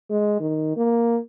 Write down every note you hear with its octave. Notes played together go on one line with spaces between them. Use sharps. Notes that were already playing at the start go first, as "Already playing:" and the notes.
G#3
D#3
A#3